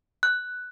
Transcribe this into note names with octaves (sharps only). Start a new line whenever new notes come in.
F#6